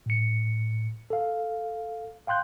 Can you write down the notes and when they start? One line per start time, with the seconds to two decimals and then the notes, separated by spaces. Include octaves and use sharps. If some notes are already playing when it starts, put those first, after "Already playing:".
0.06 A2 C#7
1.10 A4 F5
2.27 F5 G5 C6 F#6 G6